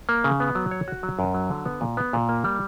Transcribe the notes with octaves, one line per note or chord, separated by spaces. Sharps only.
A#3
C#3
B3
F#3
C#5
F#4
F#3
F#2
F#3
D3
B3
A#2
B3
A#2
A#3
G3